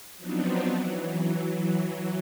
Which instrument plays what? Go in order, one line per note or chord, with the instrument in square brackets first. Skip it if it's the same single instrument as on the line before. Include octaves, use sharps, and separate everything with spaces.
[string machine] F3 F#3 B3 C4 D4 D#4
E3 F#3